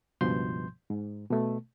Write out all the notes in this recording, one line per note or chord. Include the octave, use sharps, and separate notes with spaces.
C#2 G2 B2 F3 C6 G6
G#2
B2 A3